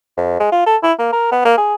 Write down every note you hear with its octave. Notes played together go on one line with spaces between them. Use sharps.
F2
G#3
F4
A4
E4
A#3
A#4
B3
A#3
G#4